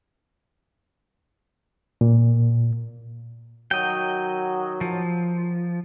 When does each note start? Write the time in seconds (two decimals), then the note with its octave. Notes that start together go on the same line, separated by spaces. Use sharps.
2.01 A#2
3.71 D#3 F#3 D#5 G5
4.81 F3